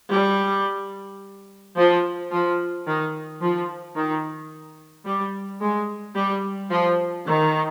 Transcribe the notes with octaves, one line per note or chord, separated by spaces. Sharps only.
G3
F3
F3
D#3
F3
D#3
G3
G#3
G3
F3
D#3